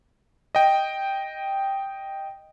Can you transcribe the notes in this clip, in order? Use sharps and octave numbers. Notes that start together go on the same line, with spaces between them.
D#5 G5